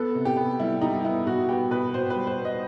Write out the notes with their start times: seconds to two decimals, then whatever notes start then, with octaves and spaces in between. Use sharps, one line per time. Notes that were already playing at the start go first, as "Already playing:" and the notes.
Already playing: B3 A4
0.15 C3
0.25 G4
0.37 B3
0.60 G3 E4
0.81 G3 D#4
1.05 B3 E4
1.26 B2 F#4
1.49 B3 G4
1.71 B2 B4
1.94 B2 C5
2.10 B4
2.16 G3
2.27 C5
2.39 B3
2.45 D#5